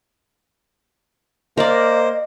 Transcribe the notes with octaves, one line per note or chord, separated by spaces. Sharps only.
A#3 A#4 C5 D5 D#5